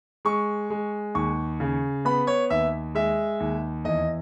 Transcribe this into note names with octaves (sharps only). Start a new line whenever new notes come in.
G#3 C#6
G#3
D#2 C#6
C#3
B3 B5
C#5
D#2 E5
G#3 E5
D#2
E2 D#5